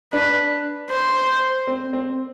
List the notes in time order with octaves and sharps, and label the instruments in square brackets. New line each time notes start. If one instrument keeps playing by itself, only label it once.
[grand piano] D4 [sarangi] B4
[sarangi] C5
[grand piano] C4
C4